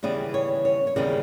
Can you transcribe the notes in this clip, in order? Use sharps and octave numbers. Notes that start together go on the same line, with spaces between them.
D#2 C#3 E3 G3 B3 D5
C#5
C#5
C#5
D#2 C#3 E3 G3 B3 D5